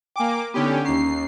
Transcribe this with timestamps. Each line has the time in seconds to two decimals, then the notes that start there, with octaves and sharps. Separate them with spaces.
0.16 A#3 G5 G#5 D6
0.54 D3 B3 C#4 D#4 G4 G5
0.85 D#2 C#4 A#5 C7